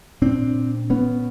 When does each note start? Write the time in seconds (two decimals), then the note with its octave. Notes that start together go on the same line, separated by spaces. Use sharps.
0.21 A#2 C4 D4
0.90 B3 C#4